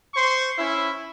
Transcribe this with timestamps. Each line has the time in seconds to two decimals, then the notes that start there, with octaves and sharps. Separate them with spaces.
0.15 C5 C6 C#6
0.58 C#4 E4